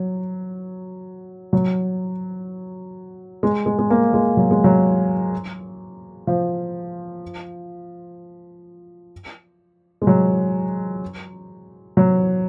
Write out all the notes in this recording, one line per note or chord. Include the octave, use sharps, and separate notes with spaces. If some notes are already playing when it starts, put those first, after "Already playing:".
Already playing: F#3
F#3
G#3
G#3
G#3
A#3
G#3
F#3
G#3
F#3
F3
G#3
F#3
F#3